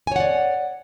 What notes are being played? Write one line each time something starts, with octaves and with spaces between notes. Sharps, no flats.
C#5 D5 F#5 G#5